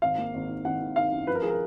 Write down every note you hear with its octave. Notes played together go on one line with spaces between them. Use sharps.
G#1 F5
A#3
G#1
D#3
G#1 F#5
D#3
D#3 F5
F#2
F3 B4
A#4
F3 G#4
A#4